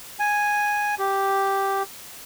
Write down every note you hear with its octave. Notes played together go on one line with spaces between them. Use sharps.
G#5
G4